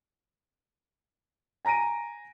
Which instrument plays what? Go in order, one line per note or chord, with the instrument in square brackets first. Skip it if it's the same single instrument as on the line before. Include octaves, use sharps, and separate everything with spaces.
[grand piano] G#5 A#5 A#6 D7 D#7